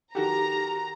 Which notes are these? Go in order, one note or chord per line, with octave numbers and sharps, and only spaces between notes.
D#3 F#4 G4 A4 A#5